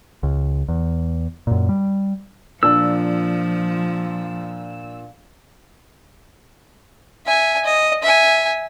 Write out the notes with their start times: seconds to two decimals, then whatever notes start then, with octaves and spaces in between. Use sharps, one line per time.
0.23 C#2
0.69 E2
1.47 F#2 A#2
1.69 G3
2.63 A#2 F3 D4 E6
7.26 E5 G#5
7.64 D#5
8.03 E5 G#5